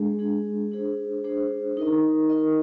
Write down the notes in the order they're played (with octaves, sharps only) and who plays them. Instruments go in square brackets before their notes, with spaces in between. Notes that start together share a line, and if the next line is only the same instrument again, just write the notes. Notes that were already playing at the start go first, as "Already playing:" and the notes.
Already playing: [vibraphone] G#3 D4 G#4
G#3 D4 G#4
D4 G#4 C5
D4 G#4 C5
D#4 A#4 D#5
D#4 A#4 D#5